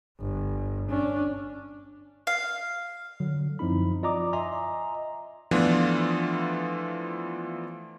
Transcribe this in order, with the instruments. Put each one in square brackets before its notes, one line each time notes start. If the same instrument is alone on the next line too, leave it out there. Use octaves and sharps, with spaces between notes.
[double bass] G1
C#4 D4
[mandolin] F5
[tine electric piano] D3 F#3
F#2 F3 C4 D#4 E4 B5
F4 D5 D#5 A#5 D6 D#6
D#5 E5 G#5 A#5 C6
[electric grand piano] E3 F3 A3 B3 D4 F4